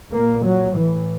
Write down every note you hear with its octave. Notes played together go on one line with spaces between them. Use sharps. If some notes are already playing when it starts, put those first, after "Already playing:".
A#2 A#3
F#3
A2 E3